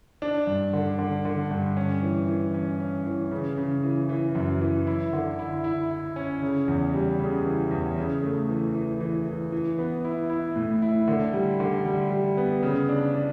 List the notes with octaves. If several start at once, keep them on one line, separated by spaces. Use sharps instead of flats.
D4
G2
D3
D3
D3
G2
C#4
E3
E3
C#4
C#4
E3
C#3
C#3
E3
E3
F#2
E3
E4
D3
E4
E4
E4
C#4
C#3
E2
G3
C#3
E3
E2
C#3
A3
E3
E3
E3
E3
E3
B3
E4
E4
A2
E4
D3
G3
D3
G3
G3
B3
C#3
D4
D4